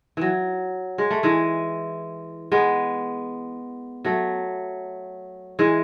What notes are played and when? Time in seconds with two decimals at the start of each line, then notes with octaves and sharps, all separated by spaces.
0.17 E3 F#3
0.98 G#3
1.10 A3
1.23 E3 G#3
2.52 G#3 B3
4.04 F#3 A3
5.59 E3 G#3